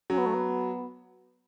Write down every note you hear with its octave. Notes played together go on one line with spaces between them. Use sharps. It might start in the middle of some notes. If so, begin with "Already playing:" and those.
F#3 C#4
B3
A3
B3